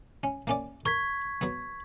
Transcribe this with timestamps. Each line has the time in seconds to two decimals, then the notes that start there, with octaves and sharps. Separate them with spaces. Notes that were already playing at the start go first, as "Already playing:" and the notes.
0.23 C#4
0.47 A#3 C#4 D5
0.86 A#4 C#6 G#6 B6
1.41 F#3 B3